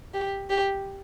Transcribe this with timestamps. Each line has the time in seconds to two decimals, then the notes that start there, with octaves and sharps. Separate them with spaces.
0.14 G4
0.50 G4